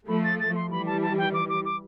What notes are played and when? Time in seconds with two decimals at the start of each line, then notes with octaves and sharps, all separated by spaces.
0.08 F3 A3 B5
0.24 A6
0.40 A6
0.56 C6
0.71 E3 G3 B5
0.87 A5
1.02 A5
1.18 G5
1.34 D6
1.49 D6
1.65 D6